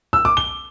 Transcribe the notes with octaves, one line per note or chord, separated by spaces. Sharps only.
E6
D6
G7